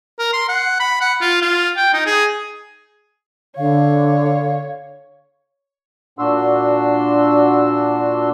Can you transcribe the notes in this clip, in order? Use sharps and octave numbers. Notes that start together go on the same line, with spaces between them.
A#4
C6
F#5
B5
F#5
F4
F4
G5
D#4
G#4
D3 C#5 F5
A#2 D4 F#4 C6 E6